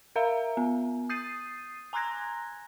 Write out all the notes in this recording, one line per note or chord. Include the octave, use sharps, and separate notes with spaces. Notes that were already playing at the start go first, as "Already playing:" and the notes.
A#4 E5 F5 A#5
B3
D#6 G6 A6 C7 D#7
G#5 A#5 C6 F#6 G#6 A#6